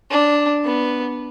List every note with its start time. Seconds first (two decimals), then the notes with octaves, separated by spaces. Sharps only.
0.11 D4
0.64 B3